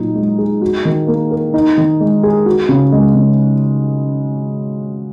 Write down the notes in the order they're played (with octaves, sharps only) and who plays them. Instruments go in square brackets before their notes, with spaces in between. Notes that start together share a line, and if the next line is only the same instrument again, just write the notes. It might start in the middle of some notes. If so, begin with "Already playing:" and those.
Already playing: [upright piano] A#2 F#3 D#4
G#3
G#4
F#4
D#3
A#3
A#4
D#4
D#3
G#3
G#4
F#4
C#3
G#3
C#3